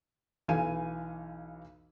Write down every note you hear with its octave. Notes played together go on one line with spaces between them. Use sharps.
B1 E3 F5 G#5 D#7